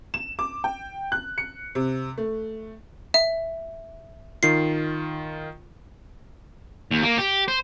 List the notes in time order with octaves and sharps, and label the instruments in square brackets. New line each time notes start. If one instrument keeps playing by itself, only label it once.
[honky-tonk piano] E7
D6
G5
F#6
C#7
C3
A3
[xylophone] E5
[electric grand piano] D#3 F4 [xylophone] C7
[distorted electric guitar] D#2
A#3
G4
C5